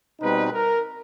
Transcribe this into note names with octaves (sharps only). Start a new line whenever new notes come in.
B2 G3 C4 D#4 B4
A#4